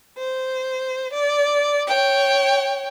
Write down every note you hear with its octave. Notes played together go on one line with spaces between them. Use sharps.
C5
D5
C#5 G5